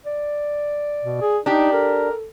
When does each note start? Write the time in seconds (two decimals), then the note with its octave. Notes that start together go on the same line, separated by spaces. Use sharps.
0.06 D5
1.03 B2
1.21 G#4
1.46 D4 D#4 G4
1.73 A4 A#4